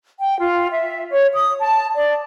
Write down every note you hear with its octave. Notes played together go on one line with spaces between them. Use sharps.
G5
F4
E5
C#5
D#6
A5
D5